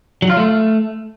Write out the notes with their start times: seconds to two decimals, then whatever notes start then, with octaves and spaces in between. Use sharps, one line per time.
0.22 F#3
0.30 F4
0.37 A3